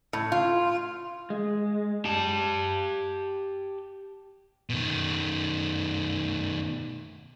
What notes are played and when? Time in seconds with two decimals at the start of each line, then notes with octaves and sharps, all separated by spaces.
0.13 A2
0.32 F4
1.30 G#3
2.06 G4 A5
4.70 B2 D#3